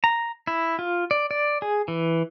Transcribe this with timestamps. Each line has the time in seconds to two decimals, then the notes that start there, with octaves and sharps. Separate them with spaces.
0.04 A#5
0.47 E4
0.79 F4
1.11 D5
1.31 D5
1.62 G#4
1.88 E3